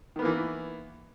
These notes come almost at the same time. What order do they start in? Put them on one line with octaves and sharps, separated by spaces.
D#3 B3 A#3 E3